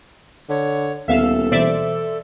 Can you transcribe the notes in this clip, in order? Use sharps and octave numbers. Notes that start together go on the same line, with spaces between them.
D3 C#5
D#1 D2 B3 A4 E5 F5 E6
B2 E3 C5 D5 E5